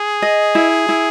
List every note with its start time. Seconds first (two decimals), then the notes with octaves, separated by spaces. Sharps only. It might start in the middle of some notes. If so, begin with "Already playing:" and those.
Already playing: G#4
0.22 D#5
0.55 E4
0.89 E4